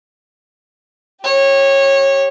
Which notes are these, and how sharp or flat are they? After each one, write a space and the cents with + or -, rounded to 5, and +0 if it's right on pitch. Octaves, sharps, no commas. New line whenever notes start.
G4 +0 C#5 -20